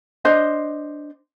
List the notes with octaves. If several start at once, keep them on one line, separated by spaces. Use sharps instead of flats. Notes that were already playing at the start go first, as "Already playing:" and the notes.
D4 C5 D#5